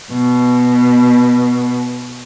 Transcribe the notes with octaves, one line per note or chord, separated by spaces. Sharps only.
B2